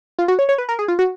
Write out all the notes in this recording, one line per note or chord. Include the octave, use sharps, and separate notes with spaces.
F4
F#4
C#5
C#5
B4
A#4
G#4
F4
F#4